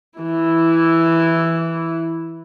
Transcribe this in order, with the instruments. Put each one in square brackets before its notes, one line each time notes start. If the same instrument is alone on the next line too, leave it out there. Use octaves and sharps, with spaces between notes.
[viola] E3 E4